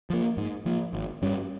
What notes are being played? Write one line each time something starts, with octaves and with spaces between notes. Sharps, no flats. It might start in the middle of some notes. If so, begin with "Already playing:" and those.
F3 A#3
G#2
F3 A#3
G#1
G2 G3 C#4